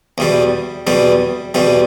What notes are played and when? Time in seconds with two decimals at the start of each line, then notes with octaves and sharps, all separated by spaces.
0.18 E2 B2 G3
0.87 E2 B2 G3
1.54 E2 B2 G3